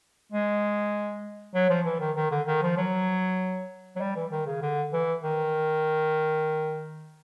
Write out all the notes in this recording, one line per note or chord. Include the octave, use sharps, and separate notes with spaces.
G#3
F#3
F3
E3
D#3
D#3
D3
D#3
F3
F#3
F#3
G3
E3
D#3
C#3
D3
E3
D#3